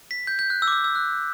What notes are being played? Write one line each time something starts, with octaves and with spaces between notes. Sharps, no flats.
B6
G6
G6
F#6
E6
D6
E6
E6
F#6